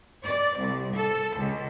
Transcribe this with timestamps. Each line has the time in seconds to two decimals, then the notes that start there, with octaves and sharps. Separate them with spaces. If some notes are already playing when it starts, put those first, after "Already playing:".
0.25 D5
0.59 C2
0.94 A4
1.37 C#2